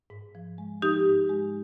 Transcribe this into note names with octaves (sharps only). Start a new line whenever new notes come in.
G#2
F3
G#3
F3 D#4 G4
G#2
G#3